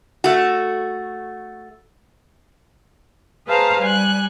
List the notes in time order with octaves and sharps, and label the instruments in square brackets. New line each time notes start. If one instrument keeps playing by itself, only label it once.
[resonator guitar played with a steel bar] A3 F#4
[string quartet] G#4 B4 C5 F5 A5 A#5
G3 G#5 F#6